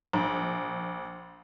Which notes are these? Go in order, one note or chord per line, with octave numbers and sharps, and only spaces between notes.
A#1